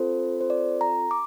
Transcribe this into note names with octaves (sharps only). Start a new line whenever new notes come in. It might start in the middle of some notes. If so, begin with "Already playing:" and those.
Already playing: C4 F4 A4 C5
C5
D5
A#5
D6